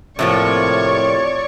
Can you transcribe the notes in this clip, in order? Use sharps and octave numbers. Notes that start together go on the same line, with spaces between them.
A2 C3 F3 A#3 C#5 D5 C#6